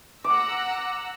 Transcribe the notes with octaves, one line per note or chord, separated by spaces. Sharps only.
F#5 A#5 D6 E6